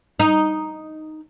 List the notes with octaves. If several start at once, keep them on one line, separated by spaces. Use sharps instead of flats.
D#4